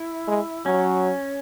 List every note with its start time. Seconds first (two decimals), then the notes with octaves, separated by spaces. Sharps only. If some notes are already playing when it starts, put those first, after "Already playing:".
Already playing: E4
0.28 G#3
0.66 F#3 C#4